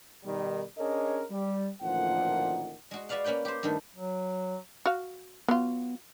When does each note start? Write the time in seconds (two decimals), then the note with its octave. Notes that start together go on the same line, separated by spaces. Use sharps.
0.24 B2 D#3 G3
0.78 C#4 D4 G#4 A#4 C#5 D#5
1.30 G3
1.82 A1 D2 A#2 D#3 F3 F#5
2.91 G#3 F#4
3.09 F#4 B4 D5 F5 F#5
3.24 A#3 C#4 B4 F#5 G5
3.45 G4 C5
3.63 G2 D#3 A3
3.96 F#3
4.86 F#4 F5
5.48 F#3 B3 F4